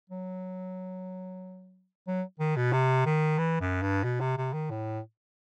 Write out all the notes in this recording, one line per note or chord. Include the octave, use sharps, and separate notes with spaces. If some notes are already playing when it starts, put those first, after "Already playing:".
F#3
F#3
D#3
B2
C3
D#3
E3
F#2
G2
B2
C3
C3
D#3
A2